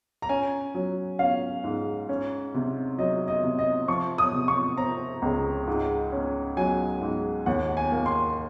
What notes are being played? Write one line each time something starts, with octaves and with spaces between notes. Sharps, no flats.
A#5
C#4 G#5
F#3
C#4 F5
G#2
C#4
C3
F#3 D#5
D#5
C3
D#5
F3 C#6
D#6
C3
C#6
C4 A#5
C#2
G#2
C#4
F#3 G#5
G#2
D#2 F#5
G#5
A#3
C6